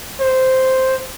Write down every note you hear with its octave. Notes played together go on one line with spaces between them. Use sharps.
C5